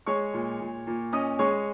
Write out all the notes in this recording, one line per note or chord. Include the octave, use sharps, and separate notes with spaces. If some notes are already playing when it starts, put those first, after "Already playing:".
G#3 C#5 C#6
A#2
A#2
A#2
C#4 D#5 D#6
G#3 C#5 C#6